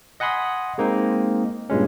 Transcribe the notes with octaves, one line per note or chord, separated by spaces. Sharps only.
D#5 F#5 G#5 B5 C6 D#6
G#3 A#3 C4 D#4
G2 A#2 G#3 C#4